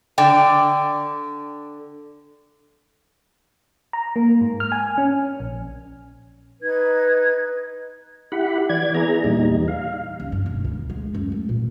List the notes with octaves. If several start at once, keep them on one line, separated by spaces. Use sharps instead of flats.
D3 D5 G5
A#5
A#3
G#2
F6
G#5
C#4
A#1
D#4 B4 G#6
E4 G4 F#5 B5
E3 D5 G#6
B3 E4 G#4 A#5
E2 A#2 G3 D#4
F5
C#2
G2
E1
D2
G#3
F#2
A3
A#2